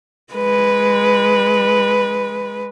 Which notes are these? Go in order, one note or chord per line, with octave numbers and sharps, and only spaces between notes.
G#3 B4